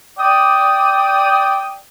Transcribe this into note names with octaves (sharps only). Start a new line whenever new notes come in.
D5 G5 D#6